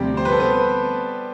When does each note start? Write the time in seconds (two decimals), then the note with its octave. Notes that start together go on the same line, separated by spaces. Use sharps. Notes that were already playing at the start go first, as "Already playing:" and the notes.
Already playing: D2 C3 F3 G3 C4 G4
0.17 C5
0.25 B4
0.32 A4
0.40 B3 B4